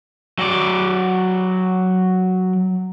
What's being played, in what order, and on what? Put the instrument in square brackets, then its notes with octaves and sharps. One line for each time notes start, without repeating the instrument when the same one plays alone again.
[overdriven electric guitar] F#3 D5